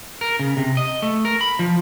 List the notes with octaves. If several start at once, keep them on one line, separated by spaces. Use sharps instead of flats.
A#4
C#3
C3
D#5
A3
A#4
B5
F3